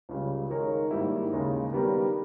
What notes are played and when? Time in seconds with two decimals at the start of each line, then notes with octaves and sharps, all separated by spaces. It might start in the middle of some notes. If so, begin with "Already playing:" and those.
0.09 C#2 C#3 G3
0.50 D#3 G#3 D#4 A#4 C#5
0.91 G#2 D#3 G3 A#3 E4
1.32 D#2 C#3 G#3 D#4
1.73 D#3 G3 B3 G4 A#4